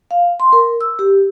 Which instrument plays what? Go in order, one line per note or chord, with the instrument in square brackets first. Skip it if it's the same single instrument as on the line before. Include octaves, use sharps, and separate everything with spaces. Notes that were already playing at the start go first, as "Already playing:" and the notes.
[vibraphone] F5
C6
A#4
E6
G4